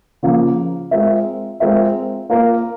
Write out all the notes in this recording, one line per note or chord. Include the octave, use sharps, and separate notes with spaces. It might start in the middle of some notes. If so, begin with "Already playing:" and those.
C#3 F3 A#3 F4
G#3 C4 F4 A#4 E5
G#3 C4 F4 A#4 E5
A#3 F4 A#4 F5